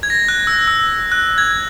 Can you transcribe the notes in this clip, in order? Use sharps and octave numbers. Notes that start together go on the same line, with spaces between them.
G#6
A#6
F#6
E6
E6
F#6
G#6